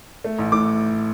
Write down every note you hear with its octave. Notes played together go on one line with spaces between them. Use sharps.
A3
A1
A2 D6